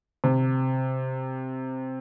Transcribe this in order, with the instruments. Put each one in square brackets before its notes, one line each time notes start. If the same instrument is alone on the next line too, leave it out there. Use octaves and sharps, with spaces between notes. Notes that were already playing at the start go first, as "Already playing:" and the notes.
[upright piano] C3